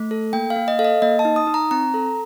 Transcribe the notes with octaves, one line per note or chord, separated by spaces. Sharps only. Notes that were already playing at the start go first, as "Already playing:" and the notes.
Already playing: A3
A4
A#3 G5
F5
A#3
D#5
A4 F5
D#5
A#3 D#5
A5
D#4
D#6
D#4
A#5
C4 A#5
A4